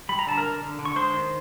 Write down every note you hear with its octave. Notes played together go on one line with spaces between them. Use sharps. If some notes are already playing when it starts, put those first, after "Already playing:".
G3 B5
A#5
D3 A5
A#4 A#5
D3
D3
D3
C#6
G#3 C5 C6
D#3